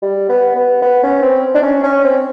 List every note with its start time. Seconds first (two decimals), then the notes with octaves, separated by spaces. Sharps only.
0.02 G3
0.29 B3
0.55 B3
0.82 B3
1.03 C#4
1.22 C4
1.55 D4
1.63 C#4
1.83 C#4
2.04 C4